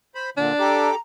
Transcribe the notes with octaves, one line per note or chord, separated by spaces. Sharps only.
C5 B5
A#2 D3 D4
G4 A4 A#5 D6